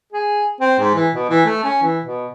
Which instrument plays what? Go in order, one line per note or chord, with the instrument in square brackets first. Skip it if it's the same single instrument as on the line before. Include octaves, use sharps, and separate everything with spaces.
[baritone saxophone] G#4
C4
G#2
E3
B2
E3
A3
C#4
E3
B2